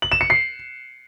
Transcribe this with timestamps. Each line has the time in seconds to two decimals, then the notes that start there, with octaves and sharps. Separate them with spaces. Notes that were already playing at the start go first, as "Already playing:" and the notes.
0.02 F#7
0.12 E7
0.21 C#7
0.30 C7